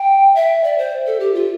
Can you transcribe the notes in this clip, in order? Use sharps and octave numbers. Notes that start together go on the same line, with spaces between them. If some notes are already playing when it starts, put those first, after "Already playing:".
Already playing: G5
E5
D5
C5
A4
G4
F4